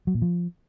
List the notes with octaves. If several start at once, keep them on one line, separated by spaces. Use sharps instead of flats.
F#3
A#2
F3